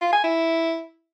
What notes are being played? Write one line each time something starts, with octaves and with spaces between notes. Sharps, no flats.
F4
G#5
E4